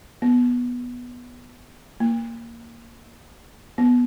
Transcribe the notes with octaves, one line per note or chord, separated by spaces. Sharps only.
B3
A#3
B3